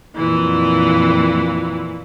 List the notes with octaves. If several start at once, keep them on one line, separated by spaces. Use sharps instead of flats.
F2 A#2 E3